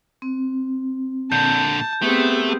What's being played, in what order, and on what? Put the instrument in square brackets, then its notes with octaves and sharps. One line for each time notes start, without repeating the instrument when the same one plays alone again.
[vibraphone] C4
[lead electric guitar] A#2 D3 [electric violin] A5 [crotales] G6
[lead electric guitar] A3 [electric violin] B3 C4 [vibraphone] G4 G#4